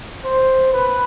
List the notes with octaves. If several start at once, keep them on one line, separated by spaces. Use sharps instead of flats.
C5
B4